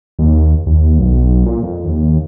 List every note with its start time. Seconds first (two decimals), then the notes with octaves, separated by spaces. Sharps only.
0.19 D#2
0.66 D#2
0.99 B1
1.46 A#2
1.63 F2
1.84 D#2